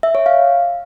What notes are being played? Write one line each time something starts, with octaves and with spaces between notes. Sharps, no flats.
E5
C#5
F5